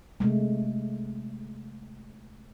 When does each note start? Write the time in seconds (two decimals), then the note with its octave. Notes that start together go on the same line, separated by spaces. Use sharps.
0.20 C3 G#3 A3